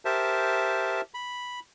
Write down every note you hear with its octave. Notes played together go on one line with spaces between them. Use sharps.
G4 A#4 C5 E5 A5
B5